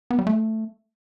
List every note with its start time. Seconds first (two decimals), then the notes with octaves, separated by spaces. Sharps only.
0.11 B3
0.19 G3
0.27 A3